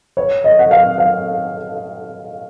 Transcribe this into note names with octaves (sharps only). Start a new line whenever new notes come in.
C#5
D#5
F#5
F5
F5